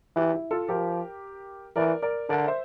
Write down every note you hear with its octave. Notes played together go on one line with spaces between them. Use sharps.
E3 E4 G4
E4
F4 A4
F3 G4 A#4
E3 A#4 D5
A#4 D5
D3 A#4 D5
C5 E5